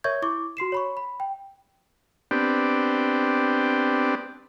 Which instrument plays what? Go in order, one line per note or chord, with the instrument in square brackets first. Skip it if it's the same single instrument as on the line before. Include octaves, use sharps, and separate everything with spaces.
[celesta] A#4 C#5 E5 C#6 G6 G#6
E4 C#6 D6
F#4 C6 C7 E7
C#5 B5 C#6
B5
G5
[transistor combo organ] B3 C4 D4 G4